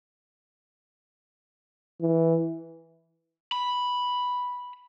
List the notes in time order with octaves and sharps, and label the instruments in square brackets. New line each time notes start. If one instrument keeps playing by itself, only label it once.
[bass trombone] E3
[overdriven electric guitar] B5